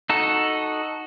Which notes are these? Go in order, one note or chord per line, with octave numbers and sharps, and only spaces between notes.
D#4 F#4 A4